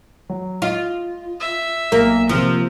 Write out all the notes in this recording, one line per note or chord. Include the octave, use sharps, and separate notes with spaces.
F#3
F4 D#5
E5
B1 A#3
C3 F3 A#3 C4